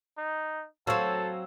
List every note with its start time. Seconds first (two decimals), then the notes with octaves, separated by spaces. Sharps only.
0.17 D#4
0.87 F#3 C4 A4 F5 C#6 E6